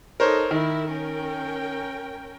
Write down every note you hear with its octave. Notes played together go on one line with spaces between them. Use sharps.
D#4 A4 A#4 C5 C#5
D#3 E4 A#4
C#4 A#4 G5